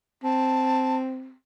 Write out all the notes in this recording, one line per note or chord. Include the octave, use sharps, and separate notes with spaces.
C4 A5